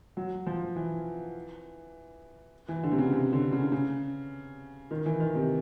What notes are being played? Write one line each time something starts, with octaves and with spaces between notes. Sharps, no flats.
F#3
F3
E3
E3
D3
C3
C#3
C3
D3
C#3
C#3
D#3
E3
D#3
C3